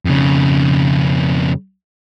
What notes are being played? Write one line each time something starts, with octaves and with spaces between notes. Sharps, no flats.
F2 C#3